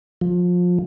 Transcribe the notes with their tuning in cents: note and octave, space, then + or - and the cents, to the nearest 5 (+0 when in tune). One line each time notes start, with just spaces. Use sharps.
F3 +25